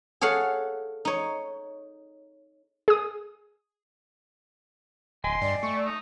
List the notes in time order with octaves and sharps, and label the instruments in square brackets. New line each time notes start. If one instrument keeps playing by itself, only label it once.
[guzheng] G#4 A4 C#5 F5 F#5
D#4 C#5
[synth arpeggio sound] G#4 D#6
[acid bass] D1 [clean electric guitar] D#5 G5 G#5 [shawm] C6
[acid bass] G2 [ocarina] D5
[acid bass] A3 [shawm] C#6
[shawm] D#4